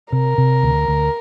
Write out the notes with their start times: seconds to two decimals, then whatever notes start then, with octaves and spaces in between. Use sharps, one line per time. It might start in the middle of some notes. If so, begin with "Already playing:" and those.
0.12 C3 A#4
0.38 C3
0.63 D2
0.88 D2